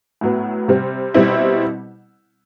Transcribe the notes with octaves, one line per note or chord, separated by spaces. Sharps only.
A2 F#3 B3
C3 G3 C4
B2 G3 C4 E4